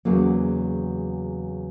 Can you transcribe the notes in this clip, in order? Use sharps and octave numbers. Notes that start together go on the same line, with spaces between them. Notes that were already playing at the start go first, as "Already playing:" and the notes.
E2 C#3 F#3 A#3